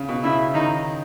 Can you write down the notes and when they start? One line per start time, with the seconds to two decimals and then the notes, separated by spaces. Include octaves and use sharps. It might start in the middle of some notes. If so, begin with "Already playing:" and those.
Already playing: C#3
0.09 B2
0.24 C#3 E4
0.54 D#3 D#4